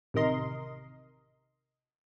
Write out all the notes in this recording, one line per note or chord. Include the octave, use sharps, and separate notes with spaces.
A1 C3 D#3 A#4 D#5 C6